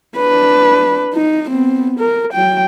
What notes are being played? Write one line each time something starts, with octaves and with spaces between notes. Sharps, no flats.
D4 B4
D#4
B3 C4
A#4
F#3 G5